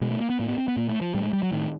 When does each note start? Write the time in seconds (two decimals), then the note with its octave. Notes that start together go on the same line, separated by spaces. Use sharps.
0.01 B2 G#3
0.11 A3
0.20 A#3
0.30 B3
0.39 A2 A#3
0.48 B3
0.58 C4
0.68 B3
0.77 A#2 A#3
0.89 A3
1.01 F3
1.14 A2 G3
1.23 G#3
1.33 G3
1.43 F#3
1.52 A2 D#3